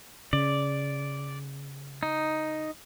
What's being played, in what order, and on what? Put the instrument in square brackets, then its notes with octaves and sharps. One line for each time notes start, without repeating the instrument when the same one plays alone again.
[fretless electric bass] C#3 [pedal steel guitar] D5
[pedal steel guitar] D#4